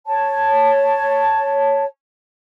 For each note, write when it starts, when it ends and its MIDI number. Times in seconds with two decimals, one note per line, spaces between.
0.07 1.84 73
0.07 1.84 81